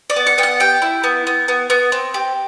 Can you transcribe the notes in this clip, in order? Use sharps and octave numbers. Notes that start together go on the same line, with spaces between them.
D5
B3
F#5
B3 G5
F#5
G4 G5
E4
B3
B3
B3
B3
C4
G4